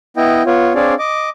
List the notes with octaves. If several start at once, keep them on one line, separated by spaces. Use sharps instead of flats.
B3 E4 D#5 G5
B3 F4 C#5
C4 D4 G#4 C#5 D5 F5
D#5 D6